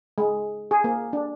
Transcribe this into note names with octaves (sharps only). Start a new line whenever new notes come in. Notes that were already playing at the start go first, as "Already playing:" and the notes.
G#3
G#4
A#3
D4